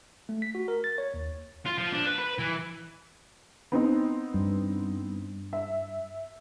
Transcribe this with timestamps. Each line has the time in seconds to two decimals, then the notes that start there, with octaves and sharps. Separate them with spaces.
0.29 A3
0.42 B6
0.55 F#4
0.68 A#4
0.84 A6
0.98 C#5
1.14 D#2
1.66 F4
1.78 F3
1.92 D4
2.06 B4
2.19 B4
2.39 E3
3.72 B3 C4 D#4
4.34 G2
5.53 E5